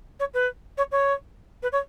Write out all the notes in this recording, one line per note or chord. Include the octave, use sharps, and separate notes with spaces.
C#5
B4
C#5
C#5
B4
C#5